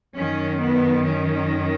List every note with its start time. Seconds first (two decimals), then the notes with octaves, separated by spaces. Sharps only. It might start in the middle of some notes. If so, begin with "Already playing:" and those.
0.17 F#2 D#3 C#4
0.61 B3
1.05 C#4